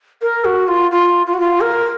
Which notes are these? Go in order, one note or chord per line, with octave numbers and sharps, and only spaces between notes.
A#4
F#4
F4
F4
F4
F#4
F4
A#4